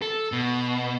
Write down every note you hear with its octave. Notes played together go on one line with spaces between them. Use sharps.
A4
B2